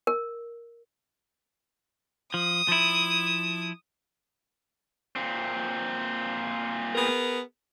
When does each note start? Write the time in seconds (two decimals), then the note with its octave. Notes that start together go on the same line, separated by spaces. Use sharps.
0.07 A#4
2.34 F3 D#6
2.68 F3 E4
5.16 A#2 C4
6.95 B3 G#4 A#4